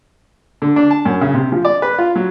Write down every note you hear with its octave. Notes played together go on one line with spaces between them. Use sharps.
D3
D4
A5
F#2
C#3
C3
F3
D5
B4
F4
F#3